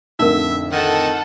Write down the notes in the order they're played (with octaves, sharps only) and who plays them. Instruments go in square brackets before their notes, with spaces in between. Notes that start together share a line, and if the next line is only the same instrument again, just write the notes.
[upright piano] F2 A2 D3 [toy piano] D#4 A#4 [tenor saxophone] E5
[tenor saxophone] D#3 [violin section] A4 F#5